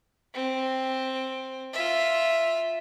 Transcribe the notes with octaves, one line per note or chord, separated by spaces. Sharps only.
C4
F4 E5